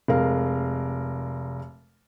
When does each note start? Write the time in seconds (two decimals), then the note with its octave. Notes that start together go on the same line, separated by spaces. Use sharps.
0.08 F1 G#3 A#4 F5